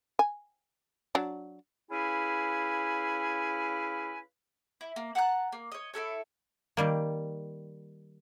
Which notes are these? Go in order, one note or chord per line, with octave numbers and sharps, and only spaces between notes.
G#5
F#3 D4
C#4 E4 G#4 B4 F5 G#5
E4
A#3
F#5 A5 A#5 F#6
A#3
C#5 D#5
E4 G4 A4 C#5
D#3 G3 A#3